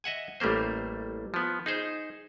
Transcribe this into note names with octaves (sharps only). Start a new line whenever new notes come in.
D#5 E5 F#5 G#5
A1 G3 A3 A#3 C5
F3 B3
D#4 G#4 C5